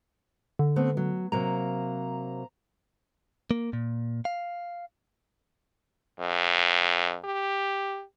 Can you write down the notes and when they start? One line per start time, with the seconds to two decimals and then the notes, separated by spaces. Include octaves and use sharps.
0.59 D3
0.76 A3 B3 C4
0.97 F#3
1.32 C3 F#3 A#3 A#5
3.51 A#3
3.73 A#2
4.25 F5
6.20 F2
7.25 G4